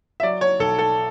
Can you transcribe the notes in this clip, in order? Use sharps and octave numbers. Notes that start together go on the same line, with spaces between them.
E5
F#3 D5
C#5
B1 A4
A4